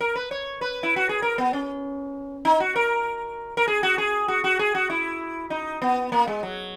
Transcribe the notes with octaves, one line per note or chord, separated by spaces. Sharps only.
A#4
B4
C#5
B4
E4
F#4
G#4
A#4
B3
C#4
D#4
F#4
A#4
A#4
G#4
F#4
G#4
F#4
F#4
G#4
F#4
E4
D#4
B3
A#3
G#3
F#3